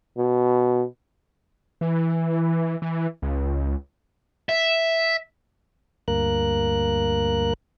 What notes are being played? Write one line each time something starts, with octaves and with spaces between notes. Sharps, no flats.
B2
E3
E3
C#2
E5
D2 G2 A#3 A#4 F#6